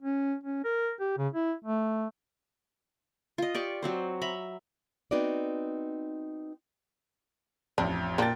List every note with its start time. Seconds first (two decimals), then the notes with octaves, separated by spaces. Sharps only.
0.02 C#4
0.44 C#4
0.64 A#4
1.00 G4
1.18 C#3
1.33 E4
1.64 A3
3.38 F4 D#5
3.54 G4 D5 C#6
3.83 F#3 C4 C5
4.21 E5 A#5 B5
5.11 B3 C4 D#4 F#4 D5
7.78 A1 F2 D4
8.18 A#2 A#3 D4 G5 A6